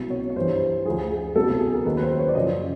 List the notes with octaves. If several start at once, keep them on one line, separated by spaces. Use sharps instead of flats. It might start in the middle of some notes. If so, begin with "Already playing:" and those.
Already playing: C2 B2 F#3
C#5
C#5
G2 E3 C5
D2 D3 F3 G#4
G#4
C2 B2 F#3 A4
G#4
A#4
D#2 D#3 F#3 B4
B4
C5
C#5
D5
F#2 C#3 F3 D#5